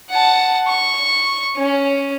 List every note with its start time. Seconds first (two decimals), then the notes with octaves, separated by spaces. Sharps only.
0.10 F#5 A5
0.69 C#6
1.57 C#4